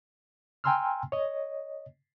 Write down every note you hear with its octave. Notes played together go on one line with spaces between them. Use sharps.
G5 G#5 A#5 C6 E6 F6
C#5 D#5